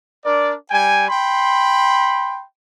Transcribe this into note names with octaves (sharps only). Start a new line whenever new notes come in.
D4 A#4 D5
G3 G5 G#5
G5 B5 C6